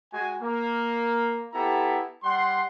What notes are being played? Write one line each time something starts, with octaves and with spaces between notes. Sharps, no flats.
G#3 F#4 G#5
A#3
B3 E4 G4 A4 A#5
G3 F#5 C6